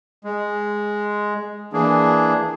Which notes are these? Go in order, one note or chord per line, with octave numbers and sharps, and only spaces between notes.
G#3
E3 A#3 D4 G#4